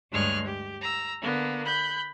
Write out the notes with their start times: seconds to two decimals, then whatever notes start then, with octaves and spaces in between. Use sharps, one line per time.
0.11 D2 G2 G#3 C#5 F6 F#6
0.45 G4
0.82 A#5 E6
1.21 D3 A#3 B3
1.65 B5 F#6 G6